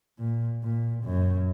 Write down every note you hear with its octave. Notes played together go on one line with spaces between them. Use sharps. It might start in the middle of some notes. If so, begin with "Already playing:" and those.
A#2
A#2
F#2